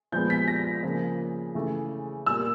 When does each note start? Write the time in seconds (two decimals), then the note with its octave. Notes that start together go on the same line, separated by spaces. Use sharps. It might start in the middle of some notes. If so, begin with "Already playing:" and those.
0.12 A#2 F3 G#3 B3 G6
0.30 B6
0.48 A#6
0.83 C#3 F3 A#3
1.55 C#3 E3 A3
2.26 A#2 G3 A#3 E6